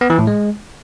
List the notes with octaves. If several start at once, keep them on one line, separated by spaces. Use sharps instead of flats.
B3
E3
A2
G#3